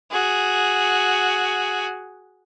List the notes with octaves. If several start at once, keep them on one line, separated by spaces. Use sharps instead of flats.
F#4 G#4